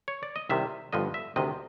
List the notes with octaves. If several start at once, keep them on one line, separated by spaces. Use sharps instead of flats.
C#5
D5
D#5
C2 C3 D#3 G3 E5
G1 G2 D3 F3 D#5
E5
D2 C3 D#3 D#5